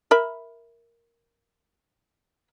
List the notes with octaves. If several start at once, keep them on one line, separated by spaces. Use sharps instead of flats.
A#4 E5 B5